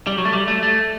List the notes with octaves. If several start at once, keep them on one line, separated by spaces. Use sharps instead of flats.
G3
F#3
A3
G3
A3
A3